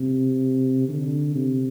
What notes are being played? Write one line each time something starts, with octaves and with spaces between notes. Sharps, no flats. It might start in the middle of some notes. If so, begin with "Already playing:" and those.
Already playing: C3
D3
C3